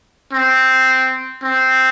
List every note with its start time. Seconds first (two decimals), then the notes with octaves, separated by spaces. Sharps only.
0.33 C4
1.43 C4